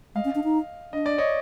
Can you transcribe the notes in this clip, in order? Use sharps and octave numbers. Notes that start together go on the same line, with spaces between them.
G#3 D#5 F5
C#4
D4
D#4
D4 D#5
D5
C#5 D#5